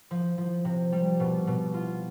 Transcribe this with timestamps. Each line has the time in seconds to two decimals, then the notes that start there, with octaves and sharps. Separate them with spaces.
0.11 F3
0.38 F3
0.65 C3
0.92 G3
1.20 B2
1.47 B2
1.74 F4